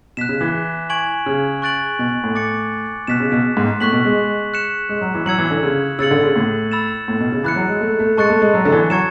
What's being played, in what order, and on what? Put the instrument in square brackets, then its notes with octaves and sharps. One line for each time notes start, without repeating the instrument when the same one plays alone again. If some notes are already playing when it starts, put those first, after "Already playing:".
[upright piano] B2 [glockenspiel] F#6 B6 E7
[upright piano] C#3
E3
[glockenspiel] G#5 C#6 G#6 D7 F#7
[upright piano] C#3
[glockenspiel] C#6 F#6 A6 D7 F#7
[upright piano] B2
A2
[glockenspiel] D6 A6 C#7
[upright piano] B2 [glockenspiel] F#6 B6 E7
[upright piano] C#3
B2
G#2
[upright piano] A2 [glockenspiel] C#6 F#6 B6 F#7
[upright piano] B2
G#3
[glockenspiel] F#6 C#7 E7
[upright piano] G#3
F#3
E3
[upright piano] F#3 [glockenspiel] E6 G#6 C#7 F#7
[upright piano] E3
D3
C#3
[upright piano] C#3 [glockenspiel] E6 A6 C#7 F#7
[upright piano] D3
C#3
A2
[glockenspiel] B5 E6 A6 E7
[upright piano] A2
B2
C#3
[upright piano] E3 [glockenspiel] B5 F#6 C#7
[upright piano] F#3
G#3
A3
A3
[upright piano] G#3 [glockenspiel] A5 C#6 F#6 A6 C#7
[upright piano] A3
G#3
F#3
D3
E3
[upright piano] F#3 [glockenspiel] C#6 G#6 C#7 E7